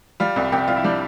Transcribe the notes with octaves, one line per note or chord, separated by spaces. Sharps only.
G3 F4
C2
C2 G4
C2 F4
E4
G3 D4